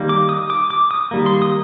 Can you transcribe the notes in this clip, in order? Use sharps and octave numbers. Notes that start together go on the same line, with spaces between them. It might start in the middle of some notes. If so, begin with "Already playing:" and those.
Already playing: D#3 G3 A#3
D6
D#6
D6
D6
D#6
D#3 G3 A#3
C6
D#6